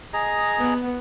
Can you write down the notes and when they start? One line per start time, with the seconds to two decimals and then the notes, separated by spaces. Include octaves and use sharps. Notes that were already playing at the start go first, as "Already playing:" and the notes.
0.13 G#4 D#5 A#5
0.59 B3